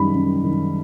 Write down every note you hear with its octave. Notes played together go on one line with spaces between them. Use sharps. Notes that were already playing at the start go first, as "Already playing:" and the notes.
Already playing: F#2 D#3 G3 B5
F#2
D#3